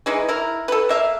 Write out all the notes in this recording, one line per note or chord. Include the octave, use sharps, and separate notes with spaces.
E3 G#3 D#4
E4 A#4
A4 B4
A#3 E5 F5